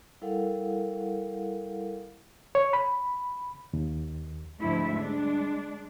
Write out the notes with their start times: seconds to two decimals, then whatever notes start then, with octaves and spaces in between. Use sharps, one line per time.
0.22 G3 E4 A4 A#4 F5 F#5
2.55 C#5
2.73 B5
3.73 D#2
4.61 D2 G#2 F3 A3 E4 E5
4.99 G3 G#3 D4